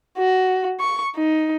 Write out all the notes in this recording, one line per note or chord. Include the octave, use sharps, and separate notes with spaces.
F#4
C#6
D#4